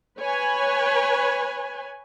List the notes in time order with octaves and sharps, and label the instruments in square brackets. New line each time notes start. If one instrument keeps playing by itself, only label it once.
[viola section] B4 C#5 G#5